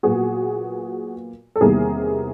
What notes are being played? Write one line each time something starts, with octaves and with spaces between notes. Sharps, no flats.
A#2 F#3 B3 F#4 G#4
A4
E2 C3 D#3 G3 A#3 G#4 A#4